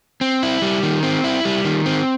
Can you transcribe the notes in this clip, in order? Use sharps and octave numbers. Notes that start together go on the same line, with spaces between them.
C4
E4
G3
D#3
C4
E4
G3
D#3
C4